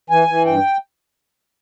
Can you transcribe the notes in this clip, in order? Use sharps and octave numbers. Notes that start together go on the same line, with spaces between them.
E3 G#5
E3
G2 G5